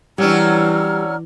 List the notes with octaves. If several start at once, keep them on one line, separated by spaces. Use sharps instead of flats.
E3 F#3 G3 C#4 D4 A#5 E6 F6